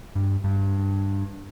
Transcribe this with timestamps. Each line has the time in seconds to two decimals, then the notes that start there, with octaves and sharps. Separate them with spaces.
0.15 G2
0.44 G2